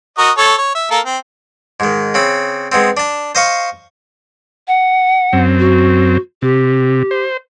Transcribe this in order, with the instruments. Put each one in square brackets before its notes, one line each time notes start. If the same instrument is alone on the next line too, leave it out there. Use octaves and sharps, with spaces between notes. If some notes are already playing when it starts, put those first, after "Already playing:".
[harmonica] F#4 A#4 D#5
A4 C#5
C#5
E5
A#3 A4 A#4
C4
[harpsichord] G#2 D#3
C#3 C4 B5
G#3 B3 C4
D4 A5
C5 D#5 F5 C#6
[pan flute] F#5
[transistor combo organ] F#2 C4
[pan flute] F#4
[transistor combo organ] C3 [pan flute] G4
[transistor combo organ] C5